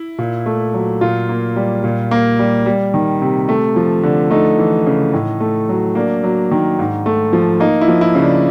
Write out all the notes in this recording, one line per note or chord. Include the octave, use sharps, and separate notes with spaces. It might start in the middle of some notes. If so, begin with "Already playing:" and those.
Already playing: E4
A#2
A3
F#3
A#2 F4
A#3
G3
A#2
A#3
G3
G3
D#3
C3
A3
F3
D3
A3 D#4
E3
C#3
A2
A3
F#3
A#3 D4
F#3
D#3
G#2
A3
F3
A#3 D#4
E4
F3
E4
C#3
D4